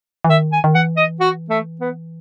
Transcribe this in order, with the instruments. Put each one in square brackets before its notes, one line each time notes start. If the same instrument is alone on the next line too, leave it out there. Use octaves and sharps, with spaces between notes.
[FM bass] E3
[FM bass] D#3 [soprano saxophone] E5
[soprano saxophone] G#5
[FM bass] D#3
[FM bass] E3 [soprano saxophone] F#5
[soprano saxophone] D#5
F#4
A3
B3